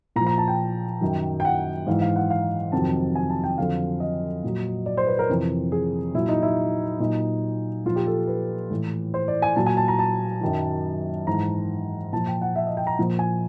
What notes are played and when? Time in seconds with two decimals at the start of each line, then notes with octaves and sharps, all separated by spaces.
0.16 A#2 A#5
0.21 F3
0.27 A#5
0.38 A5
0.48 G5
1.01 F#2 D#3 F#3
1.40 G5
1.45 F#5
1.87 G#2 E3 F5
2.02 F5
2.16 F#5
2.30 F5
2.72 F2 C3 D#3 F#3 A5
3.15 G#5
3.30 A5
3.44 G5
3.58 F2 D3 F#3 F5
4.00 D#5
4.44 A#2 F#3
4.86 D5
4.97 C5
5.07 B4
5.19 A#4
5.29 F2 C3 E3
5.72 G#4
6.14 A#2 F#3 E4
6.28 D#4
6.42 E4
7.00 A#2 F#3 D#4
7.85 A#2 F3 F4
7.96 G4
8.07 A4
8.27 B4
8.71 A2 E3
9.14 C5
9.28 D5
9.42 G#5
9.56 A#2 F#3 A5
9.66 G#5
9.77 A5
9.88 A#5
9.99 A5
10.41 F#2 D#3 F#3
11.27 G#2 E3 A#5
12.13 A#2 F3 A5
12.27 G5
12.42 F#5
12.56 E5
12.67 D#5
12.77 G5
12.87 A#5
12.99 A#2 F3
13.19 G#5